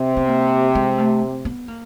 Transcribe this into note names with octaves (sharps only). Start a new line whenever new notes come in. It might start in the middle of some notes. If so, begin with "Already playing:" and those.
Already playing: C3
B3
A#3
G#3
A3
B3
A#3